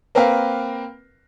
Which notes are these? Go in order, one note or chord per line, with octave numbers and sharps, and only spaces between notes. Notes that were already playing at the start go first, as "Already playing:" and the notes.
A#3 C4 A#4 B4 F5